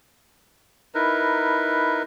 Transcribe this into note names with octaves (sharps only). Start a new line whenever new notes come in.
D#4 E4 A#4 B4